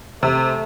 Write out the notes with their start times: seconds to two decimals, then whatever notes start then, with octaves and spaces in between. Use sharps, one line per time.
0.23 C3 A3